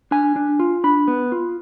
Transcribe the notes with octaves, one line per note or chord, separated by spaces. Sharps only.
D4 G#5
D4
F4
D4 B5
B3
F4